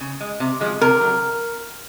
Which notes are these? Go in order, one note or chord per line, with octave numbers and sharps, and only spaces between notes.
C#3
G#3
C3
F3 G#3
C3 A#4
F#3